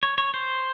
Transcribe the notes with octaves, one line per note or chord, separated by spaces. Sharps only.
C#5
C#5
C5